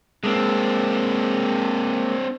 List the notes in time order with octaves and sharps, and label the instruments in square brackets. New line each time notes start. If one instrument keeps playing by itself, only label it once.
[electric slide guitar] G#3 A#3 [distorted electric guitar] C4 D4